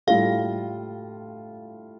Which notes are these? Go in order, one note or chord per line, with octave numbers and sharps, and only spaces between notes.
A2 G3 F4 A4 F5